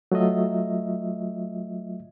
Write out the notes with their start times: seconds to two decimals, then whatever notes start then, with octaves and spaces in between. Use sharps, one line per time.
0.12 F#3 A3 F4 D#5 E5